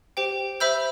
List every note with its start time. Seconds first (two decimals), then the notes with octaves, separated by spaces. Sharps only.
0.17 G4 C5 G5
0.60 C5 E5 B5 E6 G6